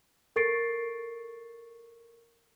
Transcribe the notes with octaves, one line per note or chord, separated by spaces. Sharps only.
A4 A#4 C#6 A6 C7 D7